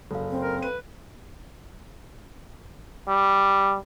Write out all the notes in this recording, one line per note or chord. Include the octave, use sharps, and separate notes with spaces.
F#1 A4 F5
C4
A#4
B4 D#7
G3